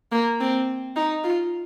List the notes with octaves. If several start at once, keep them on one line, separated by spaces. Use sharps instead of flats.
A#3
C4
D#4
F4